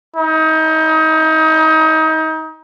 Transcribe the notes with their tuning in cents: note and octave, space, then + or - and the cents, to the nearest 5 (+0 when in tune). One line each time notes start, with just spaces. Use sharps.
D#4 +30